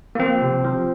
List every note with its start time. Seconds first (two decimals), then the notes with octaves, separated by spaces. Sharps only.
0.15 A#3
0.19 F3 C4
0.42 C3
0.64 F3